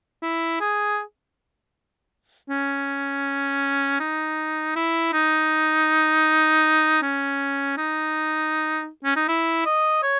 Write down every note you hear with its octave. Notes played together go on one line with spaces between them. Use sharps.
E4
G#4
C#4
D#4
E4
D#4
C#4
D#4
C#4
D#4
E4
D#5
C#5